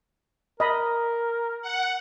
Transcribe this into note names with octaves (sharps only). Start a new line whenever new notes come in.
A#4 D#5 B5
F#5